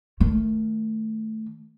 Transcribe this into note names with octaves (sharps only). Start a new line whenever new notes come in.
D#3 A3